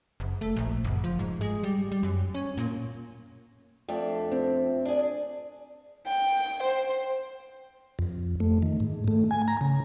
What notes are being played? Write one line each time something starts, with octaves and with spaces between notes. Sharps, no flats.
F#1
A3
A#1
F#1
F3
G#2
G#3
G3
G3
F#2
C#4
A#2
F2 A3 D4
C4
D4 G#4
G5
C5
F2
A3
D#3
G#2
A3
G#5
A#5
C#3